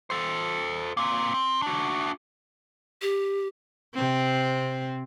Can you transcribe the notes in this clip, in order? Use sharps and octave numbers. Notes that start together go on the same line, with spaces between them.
A4 C5
A#3 C4
C4
D4 F#4
G4
C3 C4